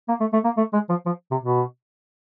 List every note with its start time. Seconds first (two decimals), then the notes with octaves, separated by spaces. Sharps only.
0.08 A#3
0.20 A3
0.33 A3
0.44 A#3
0.57 A3
0.73 G#3
0.89 F3
1.06 F3
1.31 C3
1.43 B2